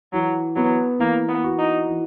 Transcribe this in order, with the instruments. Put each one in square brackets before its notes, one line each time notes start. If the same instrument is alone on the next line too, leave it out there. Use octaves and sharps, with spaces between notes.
[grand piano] E3 [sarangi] F#3
[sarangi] F#3 [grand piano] B3
[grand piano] E3 [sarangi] A#3
[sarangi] B3
[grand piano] F#4
[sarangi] D#4
[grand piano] E3